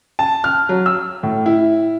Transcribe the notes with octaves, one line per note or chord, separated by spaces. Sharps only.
A5
F6
F#3
E6
A2
E4